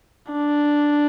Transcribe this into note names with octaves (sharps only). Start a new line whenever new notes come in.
D4